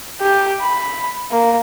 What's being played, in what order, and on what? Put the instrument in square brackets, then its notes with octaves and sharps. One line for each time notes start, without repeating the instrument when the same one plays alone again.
[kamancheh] G4
B5
A#3